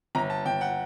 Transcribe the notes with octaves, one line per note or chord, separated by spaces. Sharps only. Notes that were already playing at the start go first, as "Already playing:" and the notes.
G1 A#5
A5
G1 G5
F#5